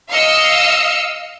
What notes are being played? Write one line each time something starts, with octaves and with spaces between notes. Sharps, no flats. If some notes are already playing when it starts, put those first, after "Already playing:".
D#5 F5 E6 C#7